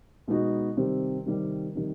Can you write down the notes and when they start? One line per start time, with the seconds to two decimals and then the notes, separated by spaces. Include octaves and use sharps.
0.28 B2 G#3 B3 D#4 F#4
0.77 C3 D#3 G3 C4
1.26 C3 D#3 G3 C4
1.75 C3 D#3 G3